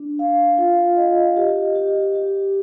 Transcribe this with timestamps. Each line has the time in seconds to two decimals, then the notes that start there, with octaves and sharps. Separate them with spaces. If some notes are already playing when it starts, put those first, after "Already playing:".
Already playing: D4
0.19 F5
0.58 F4
0.97 D#5
1.37 G4
1.75 G4
2.15 G4